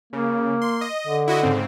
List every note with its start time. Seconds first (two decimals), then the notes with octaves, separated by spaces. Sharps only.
0.13 C#3 A#3
0.62 C6
0.81 D#5
1.07 D3
1.28 E4 F#4 D#5
1.43 G#2 C#3 C4